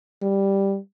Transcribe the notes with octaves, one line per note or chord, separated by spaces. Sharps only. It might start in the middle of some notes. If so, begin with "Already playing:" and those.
G3